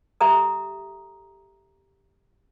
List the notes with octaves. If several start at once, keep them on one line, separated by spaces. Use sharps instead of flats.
G4 A4 E5 A#5 D#6